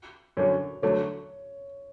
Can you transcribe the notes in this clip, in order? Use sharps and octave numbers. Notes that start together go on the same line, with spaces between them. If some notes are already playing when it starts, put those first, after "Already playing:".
F#2 D3 F#3 C#5
D3 F#3 A3 C#5